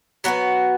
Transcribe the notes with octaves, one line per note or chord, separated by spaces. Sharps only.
F#3 B3 F#4 B4